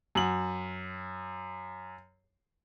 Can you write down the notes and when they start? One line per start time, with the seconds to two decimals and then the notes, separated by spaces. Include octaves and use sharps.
0.15 F#2 F#7